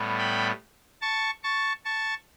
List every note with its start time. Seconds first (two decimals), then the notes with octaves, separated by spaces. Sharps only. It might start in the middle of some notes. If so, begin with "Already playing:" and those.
Already playing: A2 G3 B3
0.18 G5 B5
1.01 A5 C#6
1.43 A5 C#6
1.85 A5 C#6